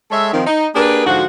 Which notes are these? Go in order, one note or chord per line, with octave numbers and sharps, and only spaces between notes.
G#3 A4 C#5 E5
D#3 F3 C4
D#4
A#3 D4 G4 G#4 A#4 B4
G#2 D3 F3 F#4